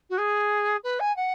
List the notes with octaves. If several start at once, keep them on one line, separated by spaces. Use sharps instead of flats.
F#4
G#4
B4
G#5
F#5